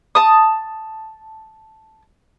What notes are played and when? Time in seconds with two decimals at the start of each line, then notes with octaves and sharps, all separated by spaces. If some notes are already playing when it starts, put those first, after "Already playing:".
0.15 A5 D#6